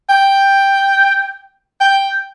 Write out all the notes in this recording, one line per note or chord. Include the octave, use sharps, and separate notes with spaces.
G5
G5